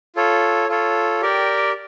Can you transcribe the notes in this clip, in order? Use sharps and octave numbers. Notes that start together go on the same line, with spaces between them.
F4 A4 C#5
F4 A4 C#5
G4 A#4 D5 G5